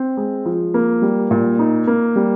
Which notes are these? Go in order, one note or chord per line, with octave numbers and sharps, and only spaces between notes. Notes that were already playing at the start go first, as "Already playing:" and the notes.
Already playing: C4
G#3
F3
A#3
G3
A#2
D#4
A#3
G3